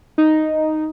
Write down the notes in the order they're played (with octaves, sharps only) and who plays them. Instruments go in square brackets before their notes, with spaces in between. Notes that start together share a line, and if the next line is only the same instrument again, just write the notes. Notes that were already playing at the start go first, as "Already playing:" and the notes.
[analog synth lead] D#4